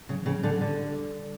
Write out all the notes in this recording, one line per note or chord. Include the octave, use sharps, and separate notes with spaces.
C#3 F#3
E3
C#3
F#3
D3
F#3
D3 G3